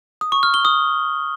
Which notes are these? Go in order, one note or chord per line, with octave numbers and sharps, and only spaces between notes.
D#6
C#6
F6
G7
D#6